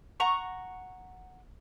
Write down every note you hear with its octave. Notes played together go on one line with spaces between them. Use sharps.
F#5 A#5 C#6